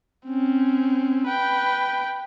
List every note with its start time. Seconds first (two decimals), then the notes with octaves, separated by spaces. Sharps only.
0.26 C4 C#4
1.26 B4 G5